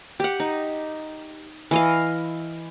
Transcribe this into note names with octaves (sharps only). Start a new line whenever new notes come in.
G4 F#5
D#4
E3 D#5 F5